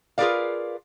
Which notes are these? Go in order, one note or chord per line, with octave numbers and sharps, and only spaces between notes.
F4 G#4 A#4 B4 D5 F5